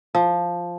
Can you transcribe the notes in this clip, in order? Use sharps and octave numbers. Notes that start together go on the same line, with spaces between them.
F3